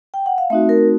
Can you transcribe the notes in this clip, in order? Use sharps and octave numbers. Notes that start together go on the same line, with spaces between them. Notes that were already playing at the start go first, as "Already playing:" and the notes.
G5
F#5
F5
A3 C4 D#4 F#4 E5
A#4